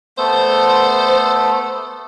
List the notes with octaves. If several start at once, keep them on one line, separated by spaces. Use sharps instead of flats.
A3 B3 A4 C5